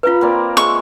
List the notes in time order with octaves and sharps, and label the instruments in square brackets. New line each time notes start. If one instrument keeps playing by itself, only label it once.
[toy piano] F4 B4 [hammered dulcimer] F5 A#5 B5
[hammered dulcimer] A#3 C4 D5
[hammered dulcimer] G#3 E5 [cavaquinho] C#6